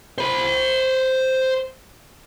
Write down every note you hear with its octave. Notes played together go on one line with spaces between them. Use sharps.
C5 B5